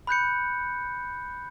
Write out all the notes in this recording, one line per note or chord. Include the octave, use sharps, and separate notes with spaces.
B5 F#6 G6 C#7